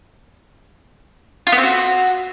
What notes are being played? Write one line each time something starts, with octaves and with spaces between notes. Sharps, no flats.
F4
B3
C4
F#4